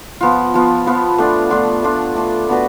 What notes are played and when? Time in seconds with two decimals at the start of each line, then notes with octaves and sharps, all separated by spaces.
0.21 F3 B3 F4
0.54 F3 B3 F4
0.86 F3 B3 F4
1.18 A3 D4 F4
1.50 A3 D4 F4
1.82 A3 D4 F4
2.15 A3 D4 F4
2.48 B3 D4 F#4 B4